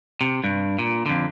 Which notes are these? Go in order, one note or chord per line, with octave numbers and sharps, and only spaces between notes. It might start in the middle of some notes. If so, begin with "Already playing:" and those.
C3
G2
A#2
F2 D3